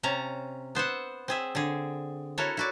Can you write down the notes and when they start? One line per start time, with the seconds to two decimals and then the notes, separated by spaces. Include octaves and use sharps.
0.03 C3 C#4 A5 A#5
0.75 B3 C5 E5 F#5
1.28 C4 G#4 E5
1.55 D3 G#4
2.38 E4 F#4 A4 A#4 C#5
2.57 E4 F#4 D5